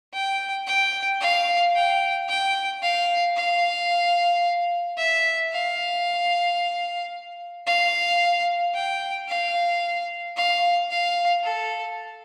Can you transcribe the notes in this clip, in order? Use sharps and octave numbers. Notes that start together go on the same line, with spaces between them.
G5
G5
F5
G5
G5
F5
F5
E5
F5
F5
G5
F5
F5
F5
A4